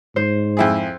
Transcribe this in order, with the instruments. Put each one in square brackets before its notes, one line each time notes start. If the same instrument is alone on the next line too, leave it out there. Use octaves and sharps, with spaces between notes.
[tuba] G#2 [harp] C5
[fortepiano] F2 E4 G#4